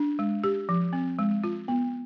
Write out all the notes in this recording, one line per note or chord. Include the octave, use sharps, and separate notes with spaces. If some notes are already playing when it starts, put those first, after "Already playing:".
Already playing: D4
G#3
G4
F3
C4
G#3
F4
B3